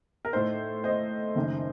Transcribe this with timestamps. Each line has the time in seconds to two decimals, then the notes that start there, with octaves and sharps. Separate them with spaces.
0.25 A#4
0.33 A2 A3 D#4 C5
0.84 C5 D#5
1.35 F#1 F#2 D#3